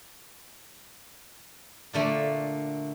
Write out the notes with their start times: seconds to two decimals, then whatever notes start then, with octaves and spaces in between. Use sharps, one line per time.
1.93 A#2 D3 A3